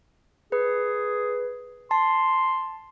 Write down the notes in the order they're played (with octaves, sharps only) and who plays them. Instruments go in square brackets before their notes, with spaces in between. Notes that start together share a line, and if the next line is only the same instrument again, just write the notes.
[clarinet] G#4 [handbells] B4
[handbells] A5 [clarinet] C6